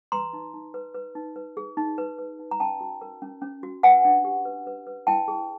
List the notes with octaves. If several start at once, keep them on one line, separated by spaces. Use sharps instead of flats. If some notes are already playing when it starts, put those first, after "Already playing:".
B4 A#5 C6
D#4
D#4
B4
B4
D#4
B4
G#4
D#4
B4
B4
D#4
A#5
C#4 G5 A5
F#4
A#4
C#4
C#4
F#4
B4 F#5 G#5
D4
G4
B4
B4
B4
E4 G5 A5
G#4